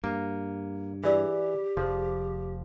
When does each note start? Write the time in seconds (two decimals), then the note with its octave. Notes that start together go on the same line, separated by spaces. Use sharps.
0.04 G2 A#3
1.04 E3 G4 G#4 D5 E6
1.77 F1 F3 G#4 C5